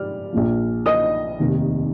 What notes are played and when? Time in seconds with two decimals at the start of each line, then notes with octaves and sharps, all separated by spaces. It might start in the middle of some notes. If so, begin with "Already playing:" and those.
Already playing: G#2 F3 G4 D5 F6
0.32 A#1 A#2 F3
0.86 D#5 D#6
1.39 F1 D#2 D#3